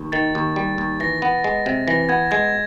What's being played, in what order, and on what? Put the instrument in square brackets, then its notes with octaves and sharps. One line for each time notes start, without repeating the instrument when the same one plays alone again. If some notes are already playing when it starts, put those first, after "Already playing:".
Already playing: [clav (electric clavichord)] D#2
[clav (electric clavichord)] D#3 [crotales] A6
[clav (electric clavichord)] D#2
G3
D#2
[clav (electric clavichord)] E3 [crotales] A#6
[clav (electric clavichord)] B3
G#3
C3
[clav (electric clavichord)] E3 [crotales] A#6
[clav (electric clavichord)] B3 [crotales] G#6
[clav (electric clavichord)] G#3 [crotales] G#6